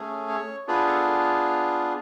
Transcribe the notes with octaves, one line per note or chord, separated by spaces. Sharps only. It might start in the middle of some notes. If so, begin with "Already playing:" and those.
Already playing: A3 C#4 G#4
C#5
B3 D4 F4 G#4 B4
A4